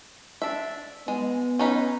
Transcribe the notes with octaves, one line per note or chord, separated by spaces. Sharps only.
D4 E5
G#3 B3
C#4 D#4 B4